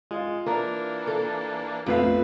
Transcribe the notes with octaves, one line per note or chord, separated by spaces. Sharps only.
G#3 F4 F5
E3 A#3 D4 A#4
A4
A#1 F2 F3 A3 B3 B4 F5 E6